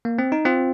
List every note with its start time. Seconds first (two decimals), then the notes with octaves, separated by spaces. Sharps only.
0.05 A#3
0.19 C4
0.32 D#4
0.45 C4 F4